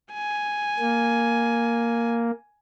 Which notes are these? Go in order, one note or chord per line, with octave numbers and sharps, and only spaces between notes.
G#5
A#3